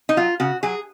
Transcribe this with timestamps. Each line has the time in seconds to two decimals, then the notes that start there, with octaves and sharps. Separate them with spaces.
0.09 D#4
0.17 F#3 F4
0.40 C#3 F#4
0.63 F#3 G#4